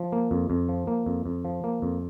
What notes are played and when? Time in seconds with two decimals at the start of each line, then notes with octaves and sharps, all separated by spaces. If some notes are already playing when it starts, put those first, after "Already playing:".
Already playing: F3
0.12 A#3
0.31 F2
0.50 F2
0.69 F3
0.87 A#3
1.06 F2
1.26 F2
1.45 F3
1.64 A#3
1.82 F2